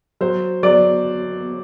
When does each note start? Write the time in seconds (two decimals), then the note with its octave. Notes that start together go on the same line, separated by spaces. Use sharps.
0.21 F#3 C5
0.63 F#3 D5